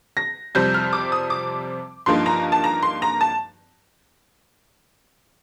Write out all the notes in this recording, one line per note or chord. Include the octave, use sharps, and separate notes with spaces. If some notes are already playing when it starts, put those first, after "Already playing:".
A#6
F2 C3 G3 C4 G6
F6
D6
D#6
D6
G2 F3 A#3 D#4 C6
A#5
A5
A#5
C6
A#5
A5